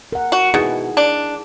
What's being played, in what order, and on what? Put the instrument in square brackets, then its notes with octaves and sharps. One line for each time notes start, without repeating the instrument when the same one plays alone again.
[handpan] A#4 F#5
[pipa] F#4
[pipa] B2 [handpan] D#4 E4 G#4
[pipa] D4